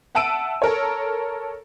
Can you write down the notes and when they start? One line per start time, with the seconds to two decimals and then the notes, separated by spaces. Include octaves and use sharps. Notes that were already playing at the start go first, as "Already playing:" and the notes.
0.15 E5 F#5 A5 E6 D7 D#7
0.62 A4 A#4 C#5